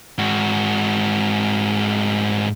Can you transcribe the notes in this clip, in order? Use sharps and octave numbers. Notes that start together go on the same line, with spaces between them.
G#2 F#4